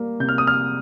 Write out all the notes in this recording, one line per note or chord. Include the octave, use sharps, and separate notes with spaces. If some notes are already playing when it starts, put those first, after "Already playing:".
Already playing: G3 A#3
C3 G6
F6
D#6
F6